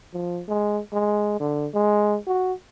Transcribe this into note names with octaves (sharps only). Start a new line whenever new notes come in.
F3
G#3
G#3
D3
G#3
F#4